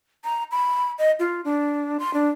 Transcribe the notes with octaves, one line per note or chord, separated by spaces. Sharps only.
A#5
B5
D#5
F4
D4
C6
D4